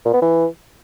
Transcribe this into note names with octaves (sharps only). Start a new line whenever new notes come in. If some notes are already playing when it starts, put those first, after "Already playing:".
A#2
B3
E3